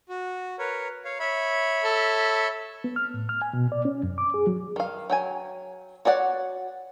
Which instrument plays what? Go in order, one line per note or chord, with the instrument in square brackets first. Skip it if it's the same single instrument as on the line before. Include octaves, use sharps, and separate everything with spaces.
[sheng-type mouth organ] F#4
A#4 B4 C#5
C#5 F5
C#5 E5 B5
[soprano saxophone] A4
[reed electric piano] B3
F6
A2
F6
G#5
B2
D5
C#4
F#2
D6
G#4
F#3
[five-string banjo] D#3 F5
F#3 G5 G#5
F#4 C#5 D5 F#5